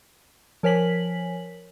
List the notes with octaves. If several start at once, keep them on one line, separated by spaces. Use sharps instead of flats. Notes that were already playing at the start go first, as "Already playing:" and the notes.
F3 A#4 C#5 G#5 B6 F#7